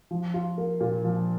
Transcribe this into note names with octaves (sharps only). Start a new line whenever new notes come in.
F3
F4
A#3
A#2
F3